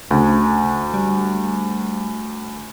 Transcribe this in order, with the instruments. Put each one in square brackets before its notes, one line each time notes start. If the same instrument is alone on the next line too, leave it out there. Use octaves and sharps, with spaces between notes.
[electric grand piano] D2 [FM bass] C#3
[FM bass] G3